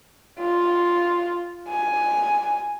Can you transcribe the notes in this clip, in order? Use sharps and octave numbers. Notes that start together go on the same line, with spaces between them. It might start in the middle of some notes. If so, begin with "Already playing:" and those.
F4
G#5